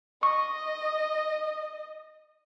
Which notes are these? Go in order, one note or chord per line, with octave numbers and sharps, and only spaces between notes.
D#5 C#6